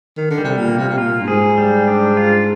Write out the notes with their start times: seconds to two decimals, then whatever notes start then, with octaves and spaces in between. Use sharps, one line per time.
0.17 D#3
0.30 D3
0.38 G3
0.44 C3
0.58 A#2
0.68 A#3
0.78 C3
0.89 C3
0.98 A#2 F4
1.21 G2
1.27 G#2 G#4
1.58 G3
1.88 D4
2.17 F4